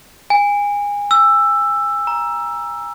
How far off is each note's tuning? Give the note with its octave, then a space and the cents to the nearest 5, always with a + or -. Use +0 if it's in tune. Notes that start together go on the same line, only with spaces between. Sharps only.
G#5 -25
E6 +10
A#5 +15